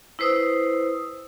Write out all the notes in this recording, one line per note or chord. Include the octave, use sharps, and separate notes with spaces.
E4 B4 C5 D#6 E6